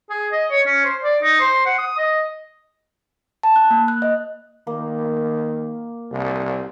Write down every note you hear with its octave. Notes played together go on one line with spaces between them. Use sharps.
G#4
D#5
C#5
C#4
C5
D5
D#4
C5
F#5
D#6
D#5
A5
F#6
A#3
F#6
D#5
D#3 A#3
C2